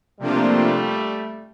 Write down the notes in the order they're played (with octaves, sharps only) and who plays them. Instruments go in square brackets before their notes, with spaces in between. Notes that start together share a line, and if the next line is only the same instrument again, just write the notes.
[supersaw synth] C3 F3 A#3 D4 F4 [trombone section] G3 A3